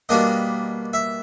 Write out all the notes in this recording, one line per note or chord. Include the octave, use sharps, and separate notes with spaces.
B2 G3 A#3 D4 D#5
E5